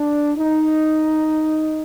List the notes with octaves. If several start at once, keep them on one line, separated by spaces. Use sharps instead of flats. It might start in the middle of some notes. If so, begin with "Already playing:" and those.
Already playing: D4
D#4